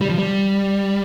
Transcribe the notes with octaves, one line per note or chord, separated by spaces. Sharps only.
G3
F3
G3